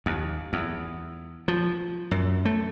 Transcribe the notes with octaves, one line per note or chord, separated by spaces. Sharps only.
D#2
E2
F3
F#2
A3